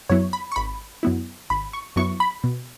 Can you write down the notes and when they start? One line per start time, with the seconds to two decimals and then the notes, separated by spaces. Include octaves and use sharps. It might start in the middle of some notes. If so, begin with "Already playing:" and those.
0.09 F#2 F#3 B3 E4 C#5
0.33 B5
0.52 C#6
0.56 G#1 B5
1.03 F#2 F#3 B3 E4
1.50 G#1 B5
1.73 C#6
1.96 F#2 F#3 B3 E4 C#6
2.20 B5
2.44 B2